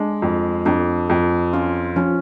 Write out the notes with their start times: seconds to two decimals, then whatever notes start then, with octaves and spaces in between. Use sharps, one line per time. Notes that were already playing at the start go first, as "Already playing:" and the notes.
Already playing: G#3 D4
0.22 F2
0.66 F2 D4
1.10 F2
1.53 C#4 F4
1.96 F3 C#4